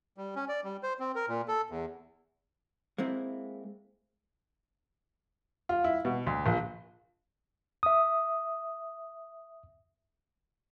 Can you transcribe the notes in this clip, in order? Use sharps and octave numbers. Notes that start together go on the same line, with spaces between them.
G3
C#4
D5
G3
C5
C4
A#4
A#2
A4
E2
G#3 A#3 C4 E4
F4
E4
B2
D2
A#1
E5 D#6